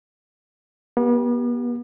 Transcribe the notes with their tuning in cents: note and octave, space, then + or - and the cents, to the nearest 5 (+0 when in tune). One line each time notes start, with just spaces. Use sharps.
B3 -40 G4 +0